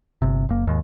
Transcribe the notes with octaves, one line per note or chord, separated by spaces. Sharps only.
G1 C3
F#1 A#3
D#2 G#2